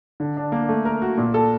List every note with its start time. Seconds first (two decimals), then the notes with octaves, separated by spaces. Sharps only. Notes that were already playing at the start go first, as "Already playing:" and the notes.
0.20 D3
0.37 D4
0.52 A#3
0.69 A3
0.85 A#4
1.02 F#4
1.17 A#2
1.34 A4